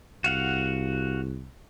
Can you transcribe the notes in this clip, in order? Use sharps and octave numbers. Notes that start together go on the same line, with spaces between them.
C2 F#4 F5 F#5